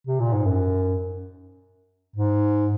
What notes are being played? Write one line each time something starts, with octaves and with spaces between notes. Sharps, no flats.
C3
A#2
G#2
F#2
G#2